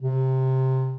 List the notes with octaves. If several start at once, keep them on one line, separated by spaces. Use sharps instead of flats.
C3